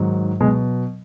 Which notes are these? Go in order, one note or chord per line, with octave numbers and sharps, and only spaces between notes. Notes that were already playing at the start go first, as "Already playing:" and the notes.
Already playing: G#2 D#3 F#3
B2 F#3 G#3